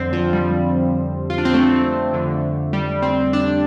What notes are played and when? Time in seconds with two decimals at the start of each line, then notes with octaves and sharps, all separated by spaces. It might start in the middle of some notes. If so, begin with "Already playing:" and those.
Already playing: F2 D3 C4 C5
0.13 F3
0.33 G3
1.30 F4
1.38 D4
1.45 C4
1.54 A3
2.13 F2 D3
2.73 G3
3.02 C4
3.33 D4